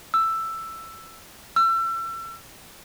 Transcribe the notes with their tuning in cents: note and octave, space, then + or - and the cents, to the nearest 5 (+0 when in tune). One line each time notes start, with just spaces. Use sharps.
E6 +10
E6 +35